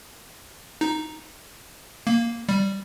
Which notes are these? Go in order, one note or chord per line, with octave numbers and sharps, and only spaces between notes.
D#4
A#3
G3